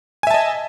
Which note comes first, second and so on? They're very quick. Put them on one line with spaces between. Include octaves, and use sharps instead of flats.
G#5 E5 A5 D#5